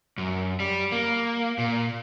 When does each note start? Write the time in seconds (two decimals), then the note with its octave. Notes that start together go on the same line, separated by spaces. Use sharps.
0.18 F#2
0.60 G3
0.92 A#3
1.58 A#2